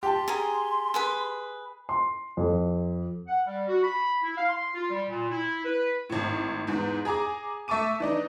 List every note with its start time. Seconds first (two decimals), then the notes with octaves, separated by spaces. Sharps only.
0.03 G4 A5 C6
0.28 G#4 G#5 A#5
0.94 G#4 B4 B5
1.89 C6
2.37 F2
3.27 F#5
3.47 G3
3.68 F#4
3.83 B5
4.23 E4
4.37 F5
4.49 C6
4.74 F4
4.90 G3
5.09 A#2
5.31 E4
5.65 B4
6.10 G#1 A2
6.67 E2 G#2 E3
7.05 G#4 G#5 A#5 D6
7.68 A3 E5 A5 C#6 D6 D#7
8.00 E3 D4 D#4